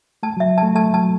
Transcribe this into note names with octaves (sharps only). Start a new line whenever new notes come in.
A3 A5
F#3
E5
A5
A3
A3 A5
F#3 A5